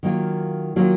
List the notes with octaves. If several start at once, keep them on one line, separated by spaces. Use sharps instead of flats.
D#3 F#3 A#3 F4
D#3 F#3 A#3 F4